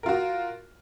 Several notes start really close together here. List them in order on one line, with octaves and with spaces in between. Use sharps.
A#4 F4 F#4